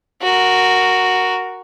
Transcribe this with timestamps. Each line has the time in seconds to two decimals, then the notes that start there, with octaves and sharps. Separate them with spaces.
0.22 F#4 A#4